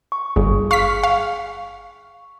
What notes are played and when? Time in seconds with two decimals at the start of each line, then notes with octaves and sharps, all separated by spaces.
0.12 C#6
0.36 G1 G#4
0.71 F5 C#6 B6
1.03 F5